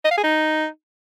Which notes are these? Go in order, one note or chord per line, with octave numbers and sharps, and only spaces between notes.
D#5
F5
G#4
D#4